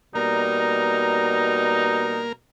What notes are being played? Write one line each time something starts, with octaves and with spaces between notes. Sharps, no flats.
B2 G3 A#3 D#4 A#4